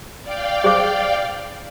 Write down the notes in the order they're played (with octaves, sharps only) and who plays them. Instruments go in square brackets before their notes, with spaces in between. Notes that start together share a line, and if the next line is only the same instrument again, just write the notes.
[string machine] D5 F5 G5
[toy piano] G#4 C5 D6